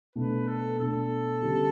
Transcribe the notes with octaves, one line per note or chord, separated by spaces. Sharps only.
B2 A3 D4 B4
A4
B2 A3 D4 A4
D3 G3 C#4 G4